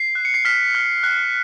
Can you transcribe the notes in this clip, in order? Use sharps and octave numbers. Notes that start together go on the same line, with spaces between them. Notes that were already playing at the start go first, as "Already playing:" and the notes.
Already playing: C7
F#6
C#7
C7
F6 B6
F6
F#6